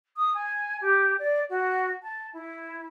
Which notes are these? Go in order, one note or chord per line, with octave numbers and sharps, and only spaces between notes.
D#6
G#5
G4
D5
F#4
A5
E4